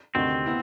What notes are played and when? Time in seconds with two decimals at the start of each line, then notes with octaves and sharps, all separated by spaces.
0.15 D2 C3 D#3 C4
0.46 B3 E4